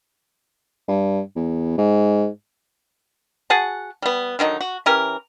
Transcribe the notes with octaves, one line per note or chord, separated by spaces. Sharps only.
G2
E2
G#2
F#4 G#4 F#5 A5
G3 B3
D3 D#3 F#3 D#4
F#4
E3 C#4 G4 A#4